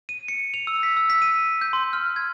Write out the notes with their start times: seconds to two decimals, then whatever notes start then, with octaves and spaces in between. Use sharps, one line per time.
0.09 D#7
0.28 C#7
0.54 F7
0.67 E6
0.83 B6
0.97 E6
1.10 B6
1.22 D#7
1.61 G6
1.73 C6
1.93 F6
2.16 G#6